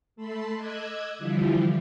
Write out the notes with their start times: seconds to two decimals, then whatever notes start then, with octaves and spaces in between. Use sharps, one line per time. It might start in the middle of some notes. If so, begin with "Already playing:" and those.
0.16 A3 A4 A5 B5 C6
0.54 D#5 D6 E6 F#6 G#6
1.18 D3 E3 F3 G3 E4 F4